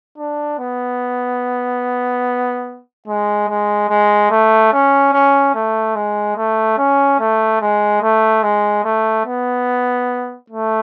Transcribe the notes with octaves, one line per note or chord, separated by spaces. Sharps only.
D4
B3
G#3
G#3
G#3
A3
C#4
C#4
A3
G#3
A3
C#4
A3
G#3
A3
G#3
A3
B3
A3